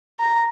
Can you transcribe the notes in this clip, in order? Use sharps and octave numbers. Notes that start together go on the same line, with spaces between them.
A#5